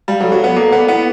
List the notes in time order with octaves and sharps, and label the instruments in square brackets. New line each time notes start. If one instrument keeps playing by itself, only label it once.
[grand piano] G3 [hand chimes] F5
[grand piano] F#3
[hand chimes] A4
[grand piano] F#3
[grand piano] B3 [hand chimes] D5
[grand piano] A#3 [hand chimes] A4
[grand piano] B3 [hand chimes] A4
[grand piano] B3 [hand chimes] E4